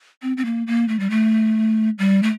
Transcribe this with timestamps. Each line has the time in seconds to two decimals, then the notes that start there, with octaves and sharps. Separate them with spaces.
0.22 C4
0.37 C4
0.45 A#3
0.67 A#3
0.88 A3
1.00 G3
1.10 A3
1.99 G3
2.23 A3